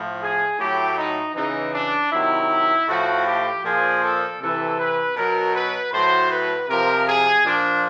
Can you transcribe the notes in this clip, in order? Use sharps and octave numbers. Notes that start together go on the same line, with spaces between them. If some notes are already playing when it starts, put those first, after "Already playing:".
Already playing: A2 F3
G#4
A2 F#3 G4
D#4
C#3 E3 D#4
D4
C3 D#3 F#3 E4
A2 F3 F#4
G4
A#2 F3 G#4
A4
C3 E3 A4
B4
B2 F#3 A#4
B4
A2 F#3 C5
B4
C3 F3 A#4
G#4
A#2 F3 D4